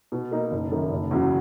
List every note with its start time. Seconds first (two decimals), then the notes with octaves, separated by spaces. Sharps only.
0.12 B2
0.31 A#3 D#4
0.51 F#1
0.71 F#2 D#3 A#3
0.91 F#1
1.11 E2 C#3 F#3